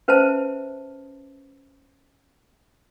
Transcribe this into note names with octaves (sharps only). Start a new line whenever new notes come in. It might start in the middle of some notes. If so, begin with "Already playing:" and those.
C#4 B4 C5 E5 A5